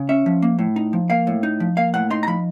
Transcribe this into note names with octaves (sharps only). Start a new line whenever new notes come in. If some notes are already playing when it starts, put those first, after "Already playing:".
Already playing: C#3
C#4 E5
F3
A#3
A2
D#4
F3
A#3 F5
A2
D#4
F3
A#3 F5
A2 F#5
D#4 C6
A#5
F3 B5